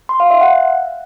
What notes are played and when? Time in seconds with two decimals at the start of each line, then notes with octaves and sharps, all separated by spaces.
0.09 C6
0.20 F5
0.31 E5
0.41 F#5